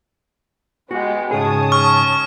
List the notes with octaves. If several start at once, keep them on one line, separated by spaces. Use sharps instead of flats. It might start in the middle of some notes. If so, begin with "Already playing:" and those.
G#3 B3 F#4 G4 F#5
G#2 C#3 G#4 C#5 A5 D#6
C#6 F6